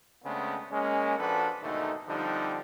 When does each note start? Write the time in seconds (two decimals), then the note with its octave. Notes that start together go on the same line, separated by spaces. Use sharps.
0.24 C#3 G#3 A3 B3 C4 D4
0.72 G#3 A#3 C#4
1.18 A#1 F3 D4 F#4 A4 B4
1.63 D#2 G#2 B2 D3 A3 D#4
2.08 D3 F3 G3 C4 D4 D#4